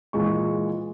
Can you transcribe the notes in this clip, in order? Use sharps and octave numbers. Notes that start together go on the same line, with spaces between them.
A#2 E3 G#3 C#6